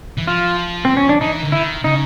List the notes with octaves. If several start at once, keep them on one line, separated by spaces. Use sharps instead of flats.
E3
F3 F4
C4
C#4
D4
E3 D#4
D3
D#3 E4
C#3 D#4